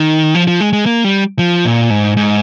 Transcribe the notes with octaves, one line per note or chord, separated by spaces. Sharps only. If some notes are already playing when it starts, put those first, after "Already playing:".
Already playing: D#3
F3
F3
G#3
G#3
A#3
G3
F3
A#2
G#2
G#2